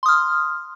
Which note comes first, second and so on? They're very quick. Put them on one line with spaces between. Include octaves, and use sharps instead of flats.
C6 D#6 F6